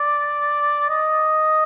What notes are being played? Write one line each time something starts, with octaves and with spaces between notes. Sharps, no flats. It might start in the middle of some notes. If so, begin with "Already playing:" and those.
Already playing: D5
D#5